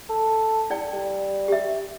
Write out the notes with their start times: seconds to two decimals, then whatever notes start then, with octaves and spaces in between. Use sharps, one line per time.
0.10 A4
0.70 E4 D5 G5
0.93 G3
1.48 G4 E5